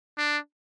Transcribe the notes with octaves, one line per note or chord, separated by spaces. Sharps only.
D4